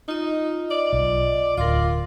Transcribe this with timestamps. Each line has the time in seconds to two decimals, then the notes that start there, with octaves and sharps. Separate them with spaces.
0.08 D#4 F4 D#5
0.71 D5
0.93 B1
1.57 D1 F4 A#4 C6 D6